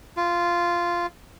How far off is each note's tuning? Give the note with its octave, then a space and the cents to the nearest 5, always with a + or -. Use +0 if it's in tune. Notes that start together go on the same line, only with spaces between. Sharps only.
F4 -10